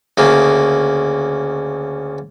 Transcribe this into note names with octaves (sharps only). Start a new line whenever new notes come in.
D2 C#3 A#3